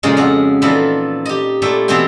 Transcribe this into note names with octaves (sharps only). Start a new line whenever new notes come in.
A#2 C#3 F3 G#3
F2 G#3 F#4
A#2 E3 F3 D#4 A4 B5
G4 D#5
A#2 A3 E4 G5
B2 E3 C4 F#4 E5 G5